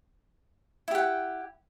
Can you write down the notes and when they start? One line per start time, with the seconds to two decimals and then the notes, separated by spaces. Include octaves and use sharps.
0.88 E4
0.91 G4
0.95 F#5
0.98 G5